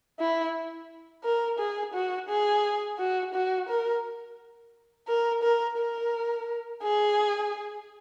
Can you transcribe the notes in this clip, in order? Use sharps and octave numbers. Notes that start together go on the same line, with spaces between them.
E4
A#4
G#4
F#4
G#4
F#4
F#4
A#4
A#4
A#4
A#4
G#4